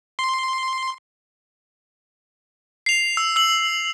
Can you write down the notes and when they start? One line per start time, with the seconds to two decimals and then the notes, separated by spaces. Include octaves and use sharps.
0.19 C6
2.86 C7 F7
3.17 E6
3.36 E6 F#7